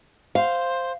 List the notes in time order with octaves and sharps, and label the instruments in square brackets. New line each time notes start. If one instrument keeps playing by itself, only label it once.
[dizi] C5 [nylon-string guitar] F5